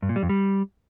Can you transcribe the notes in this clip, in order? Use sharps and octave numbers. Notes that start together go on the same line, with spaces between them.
G2
A#2
G3
F2
G3